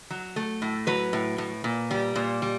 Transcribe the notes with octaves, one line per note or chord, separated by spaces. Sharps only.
F#3
A3
A2
F#3 B4
A2
A2
A#2
G3
A#2
G3